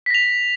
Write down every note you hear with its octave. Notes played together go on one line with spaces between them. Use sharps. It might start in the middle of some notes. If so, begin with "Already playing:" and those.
A#6 B6 F7